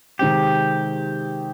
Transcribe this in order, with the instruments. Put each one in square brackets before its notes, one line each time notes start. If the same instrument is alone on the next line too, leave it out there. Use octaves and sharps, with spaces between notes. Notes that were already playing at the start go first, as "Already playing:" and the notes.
[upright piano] C3 D#3 G#3 C4 [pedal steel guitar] G4